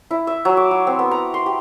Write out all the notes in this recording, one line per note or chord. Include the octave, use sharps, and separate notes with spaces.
E4
E5
F#3
D6
F#4
C4
B3
A#5
C6
G4